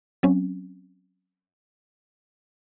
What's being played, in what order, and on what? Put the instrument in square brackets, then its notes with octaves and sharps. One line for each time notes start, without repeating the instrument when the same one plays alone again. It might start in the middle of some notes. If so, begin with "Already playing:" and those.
[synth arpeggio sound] F#3 C4 C#4